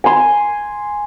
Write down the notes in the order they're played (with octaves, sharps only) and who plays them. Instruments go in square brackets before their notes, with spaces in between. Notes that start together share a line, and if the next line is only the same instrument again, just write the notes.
[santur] G#5 C6